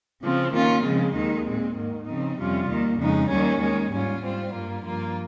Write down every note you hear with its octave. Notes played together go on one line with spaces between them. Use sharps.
C#3 F3 C4
D#3 A#3 C#4 F4
C#3 F3 G#3 C4
D#2 D#3 G#3 D#4
A#2 G#3 C4
G#2 D#3 A#3
C#3 F3 C4 D#4
F2 C3 G3 C#4 F4
D#2 D#3 A#3
F2 C#3 G#3 D#4
D#2 D#3 G3 C#4
D#3 G#3 C#4
G#2 G3 C#4 F4
G#2 G3 C4 F4
G2 G3 A#3 F4
G2 F3 A#3 F4